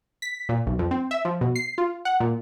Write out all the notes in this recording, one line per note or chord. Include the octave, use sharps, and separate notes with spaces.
B6
A#2
B1
F2
C4
E5
F3
B2
C7
F4
F#5
A#2